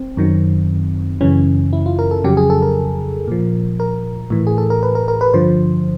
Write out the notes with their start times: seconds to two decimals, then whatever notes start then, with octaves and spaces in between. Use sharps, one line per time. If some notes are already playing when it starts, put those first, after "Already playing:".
Already playing: C4
0.17 F#2 D#3 F#3
1.21 F#2 C#3 E3 C#4
1.73 E4
1.86 F4
1.99 A#4
2.11 A4
2.24 F2 C#3 F#3 G4
2.37 G#4
2.50 A4
2.62 A#4
3.28 A#2 F3
3.80 A#4
4.30 A2 E3
4.47 G#4
4.58 A4
4.70 A#4
4.83 B4
4.95 A#4
5.08 A#4
5.21 B4
5.34 G2 D3 F3 C5